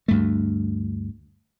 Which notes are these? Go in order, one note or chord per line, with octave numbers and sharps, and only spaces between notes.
D2 G2 A3